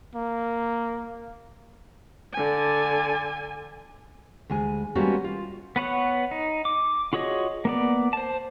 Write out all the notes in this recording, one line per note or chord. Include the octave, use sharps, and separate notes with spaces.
A#3
D3 G#5
D2 G#3 G#4 G#5
G3 G#3 A#3 B3 C#4 F#4
F4
B3 B4 C#5 F#5
D#4
D6
F4 F#4 G#4 C#5 D#5
A#3 B3 D5
C5 A5